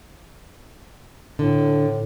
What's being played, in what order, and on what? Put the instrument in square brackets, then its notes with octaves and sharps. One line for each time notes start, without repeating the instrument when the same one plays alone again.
[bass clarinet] A2 [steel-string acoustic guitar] D3